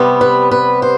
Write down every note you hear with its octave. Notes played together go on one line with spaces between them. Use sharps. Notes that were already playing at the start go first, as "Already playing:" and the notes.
Already playing: C3 G3 B3
B4
B4
C5